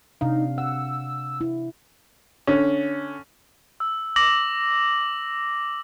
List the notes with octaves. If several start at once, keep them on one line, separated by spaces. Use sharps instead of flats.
C3 D4 D#4 F5
F#5 E6
E4
D3 C#4
E6
D6 A#6 F#7